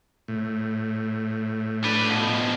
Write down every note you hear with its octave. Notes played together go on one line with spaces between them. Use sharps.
A2
D4 B4
B2 F3